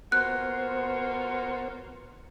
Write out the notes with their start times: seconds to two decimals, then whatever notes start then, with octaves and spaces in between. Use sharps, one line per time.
0.12 A#3 B3 F4 F#4 C5 F#6